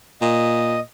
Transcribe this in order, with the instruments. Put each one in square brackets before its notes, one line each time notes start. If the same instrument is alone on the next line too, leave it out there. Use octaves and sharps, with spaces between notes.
[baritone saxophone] A#2 [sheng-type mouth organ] D#5